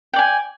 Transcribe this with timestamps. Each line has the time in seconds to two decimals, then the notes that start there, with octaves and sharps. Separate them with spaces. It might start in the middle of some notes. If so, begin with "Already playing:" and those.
0.13 G5
0.16 D5
0.19 G#5